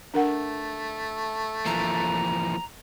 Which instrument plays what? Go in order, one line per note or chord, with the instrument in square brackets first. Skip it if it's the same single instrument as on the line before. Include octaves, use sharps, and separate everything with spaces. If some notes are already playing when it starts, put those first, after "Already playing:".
[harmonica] A3 [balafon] D4 A#4 F#5
[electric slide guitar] E3 F3 A#3 [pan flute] A#5